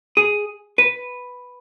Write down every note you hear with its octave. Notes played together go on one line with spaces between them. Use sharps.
G#4
B4